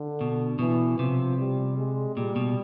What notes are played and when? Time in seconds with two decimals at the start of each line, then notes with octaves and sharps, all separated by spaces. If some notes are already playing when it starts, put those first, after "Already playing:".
Already playing: D3
0.21 B2
0.59 B2 E3
0.99 C3 F3
1.38 G3
1.77 G#3
2.16 A#2 G3
2.36 B2